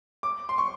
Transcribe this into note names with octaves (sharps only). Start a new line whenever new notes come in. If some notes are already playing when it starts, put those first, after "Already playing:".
D6
C6
C#6